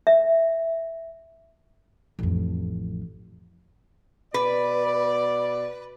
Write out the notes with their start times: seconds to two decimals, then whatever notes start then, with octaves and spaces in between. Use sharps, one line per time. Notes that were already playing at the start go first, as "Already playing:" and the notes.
0.07 E5
2.19 A1 F2
4.34 B2 B4 D5